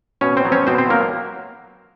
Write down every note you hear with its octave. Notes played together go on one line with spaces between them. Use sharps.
B2 C#4 C#5
C4 C5
F#3 B3
C#4 C#5
B2 C4 C5
C4 C5
F#3 A#3 B3 A#4